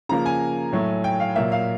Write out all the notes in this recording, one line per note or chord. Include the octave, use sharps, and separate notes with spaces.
C#3 F3 A#3 A#5
G#5
A2 F#3 A3
G5
F5
A#2 F#3 A#3 E5
F5